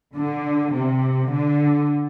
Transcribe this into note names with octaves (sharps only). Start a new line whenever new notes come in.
D3
C3
D3